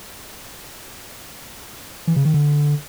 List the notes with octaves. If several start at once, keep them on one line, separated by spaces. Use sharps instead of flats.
E3
C#3
D#3
D3